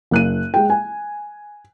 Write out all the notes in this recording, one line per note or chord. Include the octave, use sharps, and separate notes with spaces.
F#1 F#6 D#7
G#3 G5
G#5